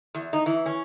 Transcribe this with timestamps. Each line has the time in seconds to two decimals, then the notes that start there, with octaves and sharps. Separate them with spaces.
0.15 E2
0.33 D#4
0.46 E3
0.66 C#4